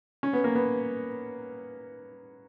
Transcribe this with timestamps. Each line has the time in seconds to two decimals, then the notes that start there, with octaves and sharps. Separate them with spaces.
0.23 C#4
0.33 B3
0.44 A#3
0.55 B3